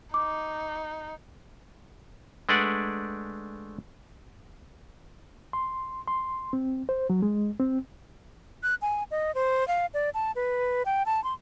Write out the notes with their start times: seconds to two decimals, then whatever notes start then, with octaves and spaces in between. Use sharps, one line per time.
0.14 D#4 D6
2.49 G#3 A3 D4 B4 D5 F#5
5.53 C6
6.08 C6
6.53 C4
6.89 C5
7.10 F#3
7.22 G#3
7.60 C4
8.63 F#6
8.82 G#5
9.11 D#5
9.35 C5
9.68 F5
9.94 D5
10.14 A5
10.36 B4
10.86 G5
11.06 A5
11.24 C6